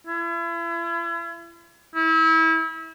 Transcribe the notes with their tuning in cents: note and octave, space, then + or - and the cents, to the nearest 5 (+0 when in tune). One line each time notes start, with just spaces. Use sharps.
E4 +40
E4 -30